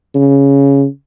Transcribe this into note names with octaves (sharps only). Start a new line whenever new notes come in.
C#3